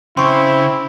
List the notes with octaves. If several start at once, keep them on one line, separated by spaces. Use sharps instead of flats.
C#3 C4 E4 C6 C#6